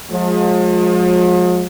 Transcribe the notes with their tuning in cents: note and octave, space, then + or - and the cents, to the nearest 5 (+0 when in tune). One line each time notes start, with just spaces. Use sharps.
F3 +45 G#3 +20